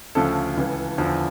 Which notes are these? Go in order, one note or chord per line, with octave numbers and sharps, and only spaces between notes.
D2 C#3 F3 A4
C#2 C#3 E3
E2 D3 F3